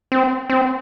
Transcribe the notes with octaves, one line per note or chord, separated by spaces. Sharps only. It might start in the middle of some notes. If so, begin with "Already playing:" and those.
C4
C4